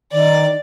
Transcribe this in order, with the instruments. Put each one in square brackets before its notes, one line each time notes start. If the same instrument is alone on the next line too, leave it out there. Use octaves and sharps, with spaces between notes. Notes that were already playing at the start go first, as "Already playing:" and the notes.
[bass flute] D#3 [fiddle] D5